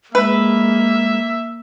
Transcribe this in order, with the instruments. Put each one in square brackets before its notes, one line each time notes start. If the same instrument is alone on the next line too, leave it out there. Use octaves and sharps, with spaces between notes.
[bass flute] G#3 [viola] A#3 [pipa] B4 [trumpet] E5